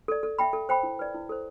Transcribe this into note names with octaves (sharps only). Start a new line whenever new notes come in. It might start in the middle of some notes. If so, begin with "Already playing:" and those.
A4 D5
A4
E5 G5 B5
A4
C5 G5 B5
E4
B4 D5
E4
A4 C5